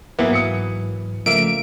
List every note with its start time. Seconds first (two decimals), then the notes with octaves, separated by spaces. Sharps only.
0.19 G#2 E3 F#3 A#3 B3
0.33 D#6 C#7
1.26 C#3 F3 A3 A#3 E5 D7